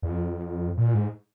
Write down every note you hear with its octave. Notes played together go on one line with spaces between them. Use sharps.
E2
F2
A#2
G#2